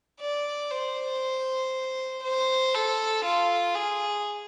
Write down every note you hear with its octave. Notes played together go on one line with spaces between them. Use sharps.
D5
C5
C5
A4
F4
G#4